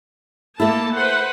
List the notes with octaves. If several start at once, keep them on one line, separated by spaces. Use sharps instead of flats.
A3 A#3 E4 A4 A5
B4 C5 F#5